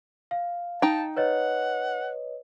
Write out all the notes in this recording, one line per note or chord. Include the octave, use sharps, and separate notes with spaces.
F5
D#4 G5 A5
B4 C#5 D#5 F#5